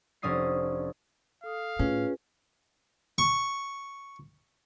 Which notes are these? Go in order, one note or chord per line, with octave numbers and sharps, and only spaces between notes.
F1 C#4 D4 D#6 C7
A4 F5 D#6
A2 C#4 F4 G#4 B4
C#6